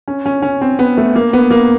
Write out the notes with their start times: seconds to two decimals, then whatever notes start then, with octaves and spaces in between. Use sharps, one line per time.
0.08 C#4
0.26 C#4
0.42 C#4
0.61 C4
0.79 B3
0.97 A3
1.15 A#3
1.33 B3
1.50 A#3